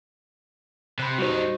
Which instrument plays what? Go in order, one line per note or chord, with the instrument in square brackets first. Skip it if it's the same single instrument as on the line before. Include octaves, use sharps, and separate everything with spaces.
[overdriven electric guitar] C3 [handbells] B5 F#6
[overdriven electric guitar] G3 D#4 [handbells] F#4 C5